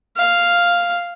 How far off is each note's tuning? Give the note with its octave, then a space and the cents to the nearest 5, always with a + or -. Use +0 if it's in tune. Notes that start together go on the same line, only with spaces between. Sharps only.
F5 +0